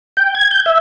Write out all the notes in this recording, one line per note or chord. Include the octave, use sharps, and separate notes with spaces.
G5
G#6
G6
E5